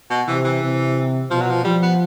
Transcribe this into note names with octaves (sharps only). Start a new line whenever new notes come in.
B2
C3 E3
E3
C3
B2 F3
F#3
F3
F3 G3
B3